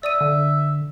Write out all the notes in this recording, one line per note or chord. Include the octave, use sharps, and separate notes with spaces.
D5 E5 D#6 D#7
D3